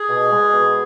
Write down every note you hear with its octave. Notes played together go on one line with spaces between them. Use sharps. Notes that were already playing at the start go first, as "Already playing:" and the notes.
Already playing: G#4
B2
G#3
B2